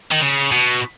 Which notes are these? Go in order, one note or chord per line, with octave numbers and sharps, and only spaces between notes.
D#3
C#3
B2